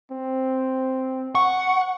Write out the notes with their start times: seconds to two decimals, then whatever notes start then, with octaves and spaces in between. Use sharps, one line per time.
0.11 C4
1.35 F#5 C#6